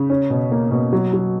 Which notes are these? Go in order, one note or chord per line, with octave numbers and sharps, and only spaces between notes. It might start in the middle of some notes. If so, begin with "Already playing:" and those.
Already playing: C#3
C#4
B2
A#3
B2
F#3
F#3